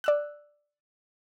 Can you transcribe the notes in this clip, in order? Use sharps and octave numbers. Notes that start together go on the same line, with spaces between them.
D5 E6 F#6